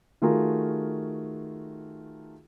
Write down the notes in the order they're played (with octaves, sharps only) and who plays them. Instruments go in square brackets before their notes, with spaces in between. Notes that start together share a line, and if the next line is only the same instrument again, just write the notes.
[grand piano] D#3 A3 F4 F#4 G#4 A#4